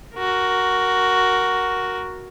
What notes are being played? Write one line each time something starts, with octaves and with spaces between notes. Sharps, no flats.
F#4 A#4